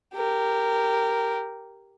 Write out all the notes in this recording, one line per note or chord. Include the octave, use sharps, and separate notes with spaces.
G4 A#4